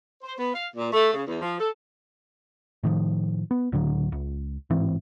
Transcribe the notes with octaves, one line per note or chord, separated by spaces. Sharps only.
C5
B3
F5
A#2
A3
C#3
E2
F3
A4
A2 D#3 F3
B3
C#2 A2 D3 F#3
C#2
A1 G#2 E3 C4